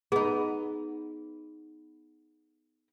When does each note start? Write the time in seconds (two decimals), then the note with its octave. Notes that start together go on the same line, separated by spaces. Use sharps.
0.12 B3 D#4 G#4